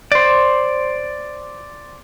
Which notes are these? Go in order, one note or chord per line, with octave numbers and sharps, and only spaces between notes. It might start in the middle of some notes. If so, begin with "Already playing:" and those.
C5 D5